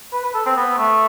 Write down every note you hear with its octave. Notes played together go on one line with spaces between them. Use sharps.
B4
B4
A4
C4
B3
A3